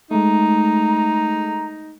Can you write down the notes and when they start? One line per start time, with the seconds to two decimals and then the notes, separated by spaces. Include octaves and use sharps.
0.11 G#3 A3 D#4 A#5